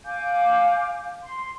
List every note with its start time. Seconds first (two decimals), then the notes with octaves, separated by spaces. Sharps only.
0.05 F5 G#5 D6 G6
1.23 C6